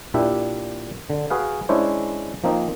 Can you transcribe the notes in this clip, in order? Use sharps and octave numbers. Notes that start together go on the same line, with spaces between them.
A#2 D4 E4 G4 E5
D3
F#4 G#4 B4 F5
G#3 C#4 D4 E4 C5 C#5
F3 A#3 C4 D#4